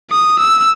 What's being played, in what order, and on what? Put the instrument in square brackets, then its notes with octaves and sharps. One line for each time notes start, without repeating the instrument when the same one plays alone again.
[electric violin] D#6
E6